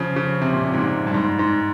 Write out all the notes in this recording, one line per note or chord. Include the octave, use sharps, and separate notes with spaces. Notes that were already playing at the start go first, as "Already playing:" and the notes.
Already playing: C#3 F3
C#3
C3
A#2
C3
G#2
A#2
G2
G#2
G#2